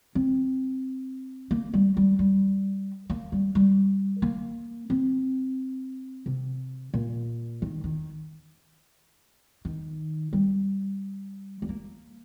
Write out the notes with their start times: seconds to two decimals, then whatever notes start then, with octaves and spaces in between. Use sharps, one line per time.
0.15 C4
1.51 A#3
1.74 G3
1.97 G3
2.19 G3
3.10 A#3
3.32 G3
3.55 G3
4.22 A#3
4.90 C4
6.26 C3
6.94 A#2
7.62 D#3
7.84 D#3
9.65 D#3
10.33 G3
11.62 G3
11.69 A#3